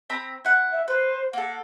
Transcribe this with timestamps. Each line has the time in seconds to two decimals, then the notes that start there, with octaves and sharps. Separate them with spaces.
0.10 C4 A#5 B5
0.45 E4 F#5
0.72 E5
0.88 B4 C5
1.33 A#3 A4 F#5